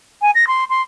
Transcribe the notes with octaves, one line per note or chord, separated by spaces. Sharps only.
G#5
A#6
C6
C6